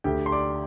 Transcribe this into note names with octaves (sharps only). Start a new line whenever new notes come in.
D2 D3 G4 G5
C6
D5 D6